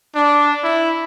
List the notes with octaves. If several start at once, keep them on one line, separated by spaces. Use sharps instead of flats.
D4
E4